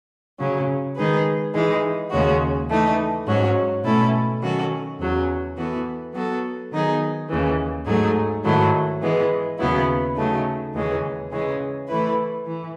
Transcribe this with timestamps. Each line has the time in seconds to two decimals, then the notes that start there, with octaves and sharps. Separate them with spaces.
0.39 C#3 F#3 C#4
0.96 D#3 G#3 D#4 G#4 B4
1.54 E3 G#3 D#4
2.11 D#2 C#3 G#3 C#4 F#4
2.69 E3 A3 D#4
3.27 G#2 F#3 C#4 F#4
3.83 B2 A3 C#4 E4 A4
4.40 D#3 F#3 C#4 F#4 A4
4.99 E2 C#3 F#3 C#4
5.56 E3 B3 F#4 A4
6.13 F#3 B3 F#4 A4
6.72 D#3 F#3 B3 D#4 G#4
7.28 D#2 C#3 E3
7.85 G#2 F#3 A3 D#4 G#4
8.44 G#2 D#3 F#3 A3 E4
9.01 E3 G#3 B3
9.58 D#2 C#3 F#3 B3 E4
10.16 C#3 F#3 A3 D#4
10.73 D#2 C#3 E3 G#3 C#4
11.30 C#3 E3 G#3 C#4
11.88 E3 A3 E4 B4
12.46 E3